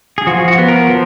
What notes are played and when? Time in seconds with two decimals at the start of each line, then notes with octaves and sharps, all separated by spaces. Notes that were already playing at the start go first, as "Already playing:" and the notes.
0.18 G#4
0.27 F3 F#4
0.48 F#4
0.58 B3
0.68 A#4
0.89 F3